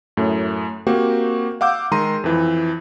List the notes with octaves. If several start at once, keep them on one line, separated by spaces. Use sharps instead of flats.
F#2 A2 A3
A#3 C4 F#4 G4
F5 F#5 D6 E6 G6
D#3 G#3 A#5 C6 D#7
F2 E3